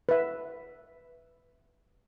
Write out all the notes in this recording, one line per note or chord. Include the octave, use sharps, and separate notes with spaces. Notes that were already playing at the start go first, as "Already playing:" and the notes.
B4 E5